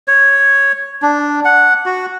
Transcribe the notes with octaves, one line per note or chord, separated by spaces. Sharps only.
C#5
D4
F#5
F#4